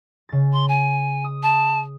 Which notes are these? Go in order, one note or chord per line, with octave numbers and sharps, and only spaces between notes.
C#3 A6
C6
G#5
D#6
A5